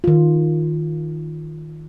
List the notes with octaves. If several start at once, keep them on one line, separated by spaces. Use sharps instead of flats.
D#3 F4